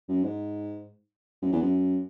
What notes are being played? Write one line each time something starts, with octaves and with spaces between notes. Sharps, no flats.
F#2
G#2
F#2
E2
F#2